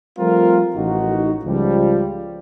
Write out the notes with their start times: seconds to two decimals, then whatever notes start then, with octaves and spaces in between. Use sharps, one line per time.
0.19 F3 G3 A3 C4 F4 A#4
0.75 A1 D#4 F#4
1.44 C#2 F3 G3